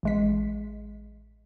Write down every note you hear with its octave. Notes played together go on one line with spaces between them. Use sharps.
A1 G#3 B6